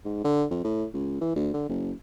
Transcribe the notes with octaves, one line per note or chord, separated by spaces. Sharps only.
G#2
D3
F2
A2
C#2
E3
D2
D3
F#1